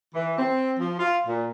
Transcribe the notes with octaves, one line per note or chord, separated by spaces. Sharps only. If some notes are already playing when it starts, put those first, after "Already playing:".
E3
C4
F3
F4
A#2